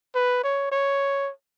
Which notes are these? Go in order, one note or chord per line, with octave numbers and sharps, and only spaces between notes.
B4
C#5
C#5